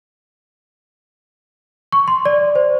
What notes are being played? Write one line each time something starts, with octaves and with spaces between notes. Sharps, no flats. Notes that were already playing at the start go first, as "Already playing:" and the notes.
C#6
C6
D5
C5